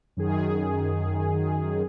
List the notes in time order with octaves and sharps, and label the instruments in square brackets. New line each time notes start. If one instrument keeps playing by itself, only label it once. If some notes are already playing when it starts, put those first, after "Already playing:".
[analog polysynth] F#2 D#3 G#4